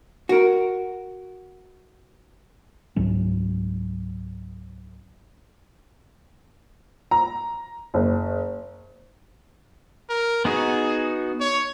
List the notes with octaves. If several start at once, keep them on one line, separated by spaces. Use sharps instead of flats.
F#4 A#4
C#2 G#2 F#3 C#4
A#5
F#1
A#4
B3 D#4 F#4 G#4
C#5